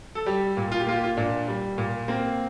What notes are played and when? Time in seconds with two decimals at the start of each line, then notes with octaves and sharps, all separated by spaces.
0.15 A4
0.26 G3 G4
0.57 A#2
0.72 F4
0.80 G4
0.87 A#3 F4
0.95 G4
1.04 F4
1.17 A#2 D4
1.48 G3
1.78 A#2
2.08 A#3 C4